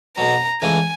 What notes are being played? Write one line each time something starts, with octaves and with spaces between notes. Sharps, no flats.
B1 B2 F#3 A#5
C#2 C#3 E3 A3 G#5